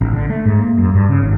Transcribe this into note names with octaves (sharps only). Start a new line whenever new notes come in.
A1
D3
A3
G#2
A#3
F#2
G2
C#3
G#1